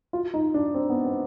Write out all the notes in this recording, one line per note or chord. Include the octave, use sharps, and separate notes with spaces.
F4
D#4
D4
C4
B3
C4